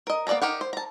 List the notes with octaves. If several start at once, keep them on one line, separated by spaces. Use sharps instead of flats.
A#4 D#5
A#3 B3 D5 G#5 A#5
D#4 G4 A#4 F#5
C5
A5 A#5